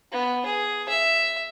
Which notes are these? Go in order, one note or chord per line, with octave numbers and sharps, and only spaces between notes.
B3
G#4
E5